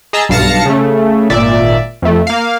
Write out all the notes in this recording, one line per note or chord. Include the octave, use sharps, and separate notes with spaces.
G#4 D#5 A5 A#5 E6
B1 G2 F5 A5 A#6 C#7
C#3 A3
G#1 A#2 D5 E5
F2 A3
A#3 F5